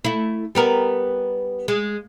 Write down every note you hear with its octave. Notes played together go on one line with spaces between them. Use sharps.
A3 E4
G3 B3 A#4
G#3